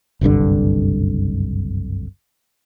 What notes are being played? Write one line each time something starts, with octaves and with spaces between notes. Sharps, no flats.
F#1 C2 G2 D3